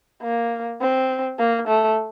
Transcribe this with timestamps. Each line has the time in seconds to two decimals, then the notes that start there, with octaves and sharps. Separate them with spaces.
0.22 A#3
0.81 C4
1.39 A#3
1.68 A3